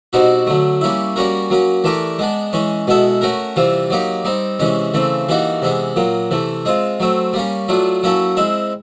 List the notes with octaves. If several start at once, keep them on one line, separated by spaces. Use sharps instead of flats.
B2 G3 C4 D#4 F#4
D3 F#3 A3
G3 A#3 C#4 E4
G3 A#3 C#4 F#4 A#4
F#3 A#3 C#4
E3 A3 D4 G4 A#4
G#3 B3 D4
E3 G#3 C#4
B2 G#3 B3 E4 A4
A3 C#4 F#4 A#4
C3 E3 G3 C4 F4
F#3 A#3 D#4 G4
G3 C4 D#4
C3 E3 G#3 C#4
C#3 E3 A3 C4
E3 G3 A#3 D#4 F#4
C3 E3 G#3 B3
A#2 F#3 A#3
C3 E3 A3
G#3 C4 F4
F#3 A3 C4
G3 A#3 C#4
F#3 A3 D4 F4
F#3 A#3 C#4 E4 A4
G#3 C4 E4